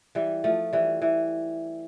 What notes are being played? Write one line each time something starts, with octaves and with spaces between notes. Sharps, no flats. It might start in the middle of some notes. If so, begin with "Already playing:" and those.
E3 G3
F3 A3
E3 G3
E3